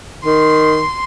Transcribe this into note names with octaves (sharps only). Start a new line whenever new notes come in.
D#3 C6